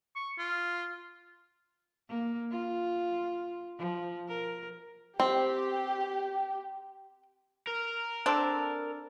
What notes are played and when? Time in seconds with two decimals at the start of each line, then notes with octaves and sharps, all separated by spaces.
0.16 C#6
0.38 F4
2.09 A#3
2.51 F4
3.78 F3
4.28 A#4
5.20 C4 G4
7.67 A#4
8.26 C4 D4 A4